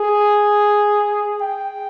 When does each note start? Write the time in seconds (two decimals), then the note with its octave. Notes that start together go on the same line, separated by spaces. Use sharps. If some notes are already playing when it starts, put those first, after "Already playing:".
Already playing: G#4
1.42 G5